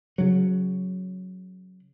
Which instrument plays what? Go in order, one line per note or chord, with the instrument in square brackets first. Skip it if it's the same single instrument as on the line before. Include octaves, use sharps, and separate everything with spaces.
[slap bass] C#3 F#3